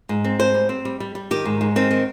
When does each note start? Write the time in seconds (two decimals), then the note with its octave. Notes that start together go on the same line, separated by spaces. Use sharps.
0.09 G#2
0.24 C4
0.39 G#2 C5
0.54 G3
0.69 C4
0.85 G3
1.00 G3
1.15 G3
1.31 D#3 G4
1.45 G#2
1.61 G#2
1.76 D#3 C4
1.91 D#3